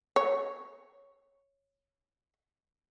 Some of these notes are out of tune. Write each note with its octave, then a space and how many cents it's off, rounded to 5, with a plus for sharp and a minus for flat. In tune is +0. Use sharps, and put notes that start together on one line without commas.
C#5 +0